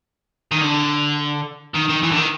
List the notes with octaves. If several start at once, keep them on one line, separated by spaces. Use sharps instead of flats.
D#3
D3
D#3
D#3
E3
D3
D#3